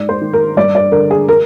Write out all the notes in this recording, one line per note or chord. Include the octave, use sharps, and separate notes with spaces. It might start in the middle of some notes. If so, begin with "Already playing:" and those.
Already playing: G#2 D5
C5
D#3
A#4
G2 D5
D5
D3 A#4
G#4
A#4